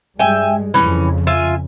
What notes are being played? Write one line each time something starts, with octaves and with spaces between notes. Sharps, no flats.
G2 G3 G#3 E5 G5 G#5
F2 C#3 E3 C#4
F4 E5 G#5